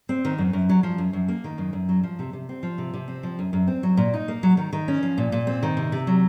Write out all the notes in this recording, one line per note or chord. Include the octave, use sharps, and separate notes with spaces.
C4
D#3
F#2
F#2
F#3
F3
F#2
F#2
A#3
D#3
F#2
F#2
F#3
F3
C3
C3
C4
F3
C3
C3
C4
F3
F#2
F#2
C4
F#3
A#2
D#4
A#3
F#3
D#3
D#3
C#4
F3
A#2
A#2
C4
D#3
C3
C3
F#3